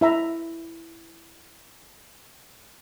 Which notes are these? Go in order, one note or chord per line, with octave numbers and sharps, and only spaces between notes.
E4 E5 A#5